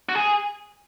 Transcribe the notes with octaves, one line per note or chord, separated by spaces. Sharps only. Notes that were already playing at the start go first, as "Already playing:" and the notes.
F#4
G#4